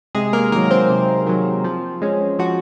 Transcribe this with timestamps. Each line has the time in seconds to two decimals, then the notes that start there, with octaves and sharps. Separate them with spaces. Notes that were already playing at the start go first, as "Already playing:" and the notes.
0.15 C3 G#3 G#4
0.33 A#3 A#4
0.52 D#3 F#3 A#3 A#4
0.70 C4 C5
0.90 C3
1.27 D#3 F#3
1.64 F3
2.02 G#3 C#4
2.39 F3 F#4